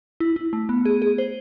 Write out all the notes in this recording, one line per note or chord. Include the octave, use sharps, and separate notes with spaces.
E4
E4
A3
B3
G#4
G#4
C5